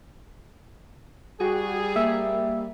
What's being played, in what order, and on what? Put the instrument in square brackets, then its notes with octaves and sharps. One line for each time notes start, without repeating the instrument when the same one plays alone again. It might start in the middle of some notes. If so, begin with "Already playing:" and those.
[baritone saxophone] G3 [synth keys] F#4 G5 [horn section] G#4
[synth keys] A#3 [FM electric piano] E5